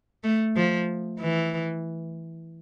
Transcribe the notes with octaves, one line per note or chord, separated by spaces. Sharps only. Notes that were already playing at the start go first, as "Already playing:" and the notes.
A3
F3
E3